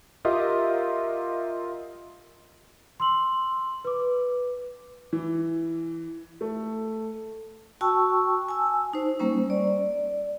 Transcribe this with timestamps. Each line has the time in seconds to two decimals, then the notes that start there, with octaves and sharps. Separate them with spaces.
0.25 F4 G4 A#4 D#5 E5
3.00 C6 E6 F#7
3.85 B4 D6
5.13 E3
6.41 A3
7.81 F#4 G5 A5 C#6 E6
8.49 G#5 A5 E6
8.93 D#4 C5
9.19 G3 A#3 C#4 C5
9.50 D5